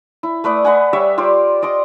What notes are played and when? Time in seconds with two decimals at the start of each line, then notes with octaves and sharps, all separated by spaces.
0.23 E4
0.44 A3 B4 D5 D#6
0.65 B4 D#5 F#5 G#5
0.93 G3 C#5 E5 E6
1.18 F4 G4 C5 D5
1.62 D5 D#5 C6 D6